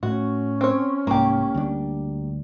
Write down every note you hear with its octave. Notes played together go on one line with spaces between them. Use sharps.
A2 A3 C#4 F#4
C4 C#5
C2 G#2 A#3 G4
D2 G3 D4